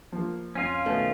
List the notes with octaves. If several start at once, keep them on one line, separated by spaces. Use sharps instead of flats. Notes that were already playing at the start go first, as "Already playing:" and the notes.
F3 A#3
F2 C#4 F4
B2 D#3 A3